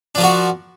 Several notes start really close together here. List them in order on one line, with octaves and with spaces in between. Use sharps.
D4 F3 A#4 F#4